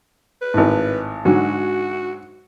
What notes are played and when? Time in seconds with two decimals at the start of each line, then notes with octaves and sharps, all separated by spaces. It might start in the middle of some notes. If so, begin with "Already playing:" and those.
0.42 B4
0.54 G#1 A2
1.25 G#2 D3 F#3 F#4